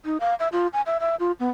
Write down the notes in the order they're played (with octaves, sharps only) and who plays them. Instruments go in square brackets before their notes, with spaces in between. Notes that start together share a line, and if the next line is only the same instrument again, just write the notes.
[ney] D#4
F5
E5
F4
G#5
E5
E5
F4
B3